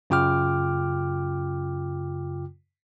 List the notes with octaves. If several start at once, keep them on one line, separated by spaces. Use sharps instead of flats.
F#2 C#3 F4 G5 D6 F6